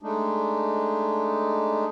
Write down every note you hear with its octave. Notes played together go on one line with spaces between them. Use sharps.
G#3 A3 D4 D#4